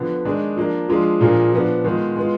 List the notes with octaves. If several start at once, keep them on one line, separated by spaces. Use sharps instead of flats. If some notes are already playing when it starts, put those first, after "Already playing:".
Already playing: D3 F3 B3
D#3 G#3 D4 G#4
F3 A#3 D4
F3 G#3 D4 F4 G#4
A#2 F3 A#3 D4 G#4
F3 B3 D4
D#3 G#3 B3 F4
G#3 B3 F4